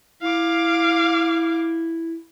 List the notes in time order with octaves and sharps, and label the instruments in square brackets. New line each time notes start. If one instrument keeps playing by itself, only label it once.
[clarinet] E4 [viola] F5 D6